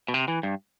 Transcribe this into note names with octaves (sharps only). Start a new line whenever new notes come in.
B2
C3
E3
G2